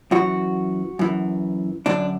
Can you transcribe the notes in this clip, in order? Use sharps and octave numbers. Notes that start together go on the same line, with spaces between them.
F#2 E3 F#4
F#2 E3
F#2 D3 D4